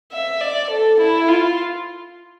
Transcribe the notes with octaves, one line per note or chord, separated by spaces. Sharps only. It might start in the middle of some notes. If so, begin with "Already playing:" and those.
E5
D5
A4
E4
F4